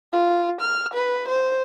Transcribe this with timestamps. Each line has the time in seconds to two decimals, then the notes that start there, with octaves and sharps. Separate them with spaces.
0.13 F4
0.61 F6
0.94 B4
1.29 C5